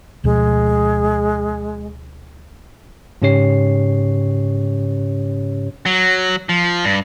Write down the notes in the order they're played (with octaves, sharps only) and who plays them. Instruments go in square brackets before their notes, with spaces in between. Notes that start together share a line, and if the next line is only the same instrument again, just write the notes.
[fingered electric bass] D2 B2 F3 [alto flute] G#3
[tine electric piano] G#2 C#3 C#4 G4 C#5 C7
[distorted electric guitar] F#3
F3
G2